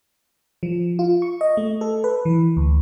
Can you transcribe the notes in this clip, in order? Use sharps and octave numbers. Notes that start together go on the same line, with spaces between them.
F3
F4
C#6
D#5
A3
A4
B4
E3
D2